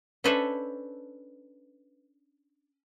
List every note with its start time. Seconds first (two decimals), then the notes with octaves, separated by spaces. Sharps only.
0.24 C#4 D4 A4 B4 C5 E5